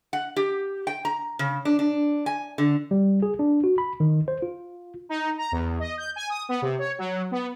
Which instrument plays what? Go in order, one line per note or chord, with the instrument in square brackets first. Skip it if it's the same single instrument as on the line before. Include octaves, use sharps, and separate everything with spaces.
[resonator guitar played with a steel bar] F#5
G4
G5
A#5
C#3
D4
D4
G#5
D3
[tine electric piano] G3
G#4
D4
F#4
B5
D#3
C5
F4
[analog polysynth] D#4
A#5
E2
D#5
G6
G#5
D#6
B3
C3
C#5
F#3
B3